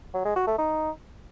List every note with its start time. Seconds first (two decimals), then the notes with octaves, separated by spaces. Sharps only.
0.14 F#3
0.25 G#3
0.36 F#4
0.47 A3
0.58 D#4